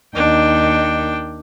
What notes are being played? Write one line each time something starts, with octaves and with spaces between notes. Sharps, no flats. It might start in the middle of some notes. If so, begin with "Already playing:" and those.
D#2 D4 D#4 G5